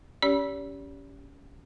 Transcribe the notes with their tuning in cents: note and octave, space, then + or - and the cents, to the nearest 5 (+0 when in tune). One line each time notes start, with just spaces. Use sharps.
C#4 +20 G4 -5 D5 -45